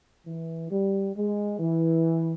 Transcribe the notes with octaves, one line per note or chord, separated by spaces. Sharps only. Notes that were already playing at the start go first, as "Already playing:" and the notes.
E3
G3
G#3
E3